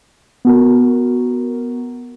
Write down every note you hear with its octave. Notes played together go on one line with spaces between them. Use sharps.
B3 F#4 A#4